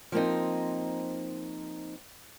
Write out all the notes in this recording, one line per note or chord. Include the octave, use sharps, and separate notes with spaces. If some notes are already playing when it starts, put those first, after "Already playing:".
F3 A#3 C4 D#4